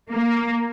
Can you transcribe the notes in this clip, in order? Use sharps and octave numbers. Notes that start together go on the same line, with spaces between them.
A#3